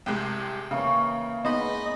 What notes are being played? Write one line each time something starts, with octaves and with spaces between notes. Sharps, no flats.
C2 C3 G#3 G5
C#3 E3 A#3 C#4
G#3 B3 D#4 D#5 B5